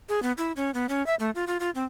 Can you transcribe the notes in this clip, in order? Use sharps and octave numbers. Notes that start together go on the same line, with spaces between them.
G#4
B3
E4
C#4
B3
C#4
E5
A3
F4
F4
F4
C4